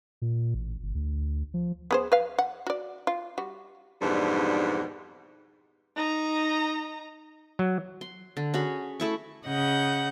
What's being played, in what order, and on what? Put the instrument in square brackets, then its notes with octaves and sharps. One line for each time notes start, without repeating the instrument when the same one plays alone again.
[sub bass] A#2
A1
G1
D2
F3
[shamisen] B3 G#4 C5
B4 F5
F#5
F#4 D5
F4
G3 F#4
[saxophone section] F2 G#2 B2 E3 G3 D4
[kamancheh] D#4 A#5
[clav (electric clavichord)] F#3
[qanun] C6
D3
C#4 F#4 G#4 B5
A3 E4 C#6
[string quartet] C#3 D#5 F#5 G6